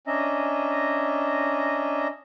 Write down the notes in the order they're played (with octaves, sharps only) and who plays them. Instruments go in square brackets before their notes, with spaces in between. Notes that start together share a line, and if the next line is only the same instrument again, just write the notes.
[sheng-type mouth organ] C#4 D4 D#5 E5 A#5